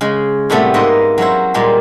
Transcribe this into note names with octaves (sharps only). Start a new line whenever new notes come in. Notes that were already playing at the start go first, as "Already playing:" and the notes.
C#3 G#3
A2 C3 G3 A3 B3
G#2 A#3 B4 D#5 E5 C6
F#3 C#4 E4 C5
A#2 G3 G#3 C6